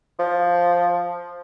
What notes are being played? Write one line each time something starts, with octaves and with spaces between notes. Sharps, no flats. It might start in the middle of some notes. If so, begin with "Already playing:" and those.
F3